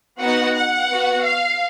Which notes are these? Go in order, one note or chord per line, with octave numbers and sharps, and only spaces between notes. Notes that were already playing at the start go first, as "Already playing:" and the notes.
B3 D#4 F#4 F#5
F#5
B3 F#4
F5